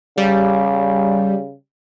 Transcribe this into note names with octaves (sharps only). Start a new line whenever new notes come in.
C#3 G3